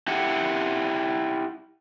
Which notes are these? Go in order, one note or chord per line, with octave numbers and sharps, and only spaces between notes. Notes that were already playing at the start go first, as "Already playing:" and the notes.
E4 G4 F#5